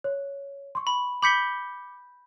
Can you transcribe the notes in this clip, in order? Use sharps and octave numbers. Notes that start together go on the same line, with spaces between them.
C#5
C6 C#6
B5
B5 D6 G6 B6 C#7 G7